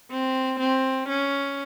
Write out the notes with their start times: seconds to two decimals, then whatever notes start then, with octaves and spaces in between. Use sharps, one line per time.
0.11 C4
0.60 C4
1.09 C#4